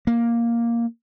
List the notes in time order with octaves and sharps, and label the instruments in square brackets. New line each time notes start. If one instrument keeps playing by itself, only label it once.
[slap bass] A#3